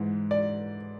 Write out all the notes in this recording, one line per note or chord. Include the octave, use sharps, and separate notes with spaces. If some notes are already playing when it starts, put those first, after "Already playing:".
Already playing: G#2 E3
D5